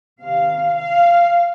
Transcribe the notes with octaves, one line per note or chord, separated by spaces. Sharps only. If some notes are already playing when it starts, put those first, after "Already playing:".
C3 D#3 F5
F5